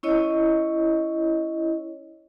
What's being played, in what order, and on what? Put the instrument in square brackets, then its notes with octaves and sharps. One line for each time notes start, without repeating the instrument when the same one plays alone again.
[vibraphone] C#4 E4 C#5 D#5